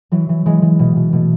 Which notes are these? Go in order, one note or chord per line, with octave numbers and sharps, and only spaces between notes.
E3 F#3
E3
E3 G#3
E3
B2
B2
B2 A3